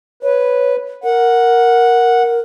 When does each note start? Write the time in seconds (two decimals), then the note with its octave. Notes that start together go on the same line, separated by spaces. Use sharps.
0.23 B4 C#5
1.04 A#4 F#5